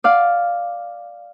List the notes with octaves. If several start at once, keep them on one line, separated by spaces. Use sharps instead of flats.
D5 F5